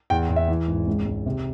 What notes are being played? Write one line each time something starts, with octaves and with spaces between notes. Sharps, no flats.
E2 G5
E2
E5
E3
G#1
C#2
C#2
C3